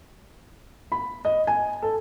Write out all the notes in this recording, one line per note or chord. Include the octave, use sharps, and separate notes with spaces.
B5
D#5
G#5
A4